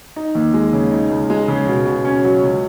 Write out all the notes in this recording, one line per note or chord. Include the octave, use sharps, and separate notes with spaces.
D#4
D#2
G#3
C#3
D#4
C#2
G#3
C#3
B2
B2
C#4
F#3
C#2